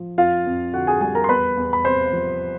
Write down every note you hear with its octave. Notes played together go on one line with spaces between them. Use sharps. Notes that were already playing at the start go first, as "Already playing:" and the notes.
Already playing: F3
F2 F4 F5
F2
D3 F#4 F#5
G#4 G#5
G3 G#4 G#5
A#4 A#5
C6
E2 B4 B5
E2
B5
C3 C5 C6
F3